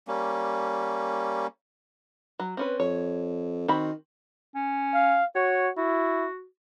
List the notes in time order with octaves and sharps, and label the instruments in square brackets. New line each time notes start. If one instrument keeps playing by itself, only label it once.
[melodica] G3 A#3 C#4
[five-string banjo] F#3
C4 C#4 B4
[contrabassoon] F2 [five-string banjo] C#5
[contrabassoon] D#3 [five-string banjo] C4 F#4 B5
[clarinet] C#4
[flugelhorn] F5
[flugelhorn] F#4 [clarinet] C#5
[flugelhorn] E4 [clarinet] F#4